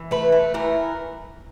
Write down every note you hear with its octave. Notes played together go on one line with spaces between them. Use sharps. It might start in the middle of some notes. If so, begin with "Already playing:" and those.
Already playing: E3
A3 B4
A3
E3 A#4